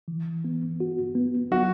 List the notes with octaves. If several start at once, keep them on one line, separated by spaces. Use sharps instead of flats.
E3
B3
F#4
B3
F#3 F#4